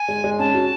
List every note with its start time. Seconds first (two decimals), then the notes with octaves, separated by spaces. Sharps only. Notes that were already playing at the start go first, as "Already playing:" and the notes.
Already playing: G#5
0.08 G#3
0.24 G#3
0.39 C#4 A5
0.54 F#4